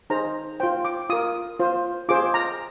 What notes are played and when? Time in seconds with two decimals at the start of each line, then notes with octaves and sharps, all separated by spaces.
0.10 D#4 G#4 C5 A#5
0.60 F4 C5 G5
0.85 D6
1.10 F4 A#4 D#6
1.59 F4 C5
2.09 F4 G#4 C5 D6
2.34 A#5